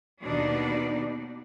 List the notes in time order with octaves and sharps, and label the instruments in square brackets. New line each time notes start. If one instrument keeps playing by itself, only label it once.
[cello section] D#2 B2 D#3 D4 D#4 D5